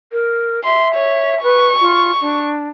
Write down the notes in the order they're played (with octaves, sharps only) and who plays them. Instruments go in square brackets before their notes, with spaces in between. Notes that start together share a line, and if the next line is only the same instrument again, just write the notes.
[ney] A#4
[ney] E5 [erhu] C6
[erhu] C#5
[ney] B4 [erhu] C#6
[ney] F4
D4